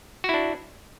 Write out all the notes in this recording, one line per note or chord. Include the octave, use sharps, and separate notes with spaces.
D4 E4 F#4